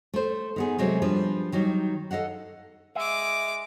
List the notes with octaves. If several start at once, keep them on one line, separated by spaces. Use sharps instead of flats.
A3 C5
D#3 B3 G#4
C3 F#3 G#3 A3 C4
F3 G3 D4 B4
D#3 F#3 G3
A4 D#5 F5 F#5
G#3 E5 D6